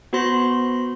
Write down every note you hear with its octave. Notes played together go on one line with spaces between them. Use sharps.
B3 F#4 C5 B5 C6 A#6